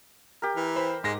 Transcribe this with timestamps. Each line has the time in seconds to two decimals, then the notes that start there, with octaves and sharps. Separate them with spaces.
0.42 G4 A#4
0.57 E3
0.76 C5 B5
1.04 G#2 G#3 A#6